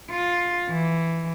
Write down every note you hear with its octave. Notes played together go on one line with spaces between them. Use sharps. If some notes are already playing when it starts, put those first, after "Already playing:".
F4
E3